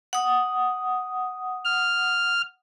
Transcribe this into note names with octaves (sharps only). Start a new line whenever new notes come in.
F#5 D#6
F6